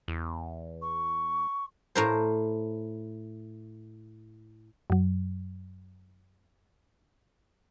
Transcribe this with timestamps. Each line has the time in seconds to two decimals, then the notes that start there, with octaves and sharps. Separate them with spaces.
0.08 E2
0.82 C#6
1.95 A2 A#4 C5
4.90 F#2 F#3